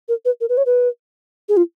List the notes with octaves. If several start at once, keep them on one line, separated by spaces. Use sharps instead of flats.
A#4
B4
A#4
B4
C#5
B4
G#4
F4